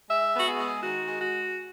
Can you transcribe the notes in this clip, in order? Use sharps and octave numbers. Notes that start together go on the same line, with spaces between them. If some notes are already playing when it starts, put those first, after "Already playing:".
G#3 E5
B3 F#4
G#4
G#3
D#3 F#4
G#3
F#4